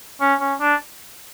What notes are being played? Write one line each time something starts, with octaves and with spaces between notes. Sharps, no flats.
C#4
C#4
D4